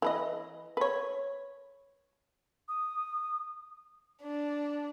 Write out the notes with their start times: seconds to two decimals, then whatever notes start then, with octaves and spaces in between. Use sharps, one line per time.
0.02 E3 B4 D#5
0.77 B4 C#5
2.69 D#6
4.22 D4